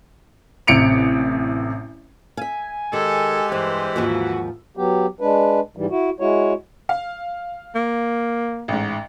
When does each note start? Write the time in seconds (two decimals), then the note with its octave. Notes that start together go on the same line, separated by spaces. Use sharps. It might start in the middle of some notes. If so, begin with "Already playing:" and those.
0.67 A1 C3 C#7 D7 F7
2.37 E5 F5 G#5
2.93 D#3 G#3 G4 A4
3.52 G2 E3 C5
3.96 D#2 G#2 F3 F#4
4.77 F#3 B3 G4
5.21 G#3 D4 B4
5.76 G#2 E3 G3
5.90 E4 F#4
6.20 G#3 E4 F#4 C#5
6.89 F5
7.75 A#3
8.68 A1 G#2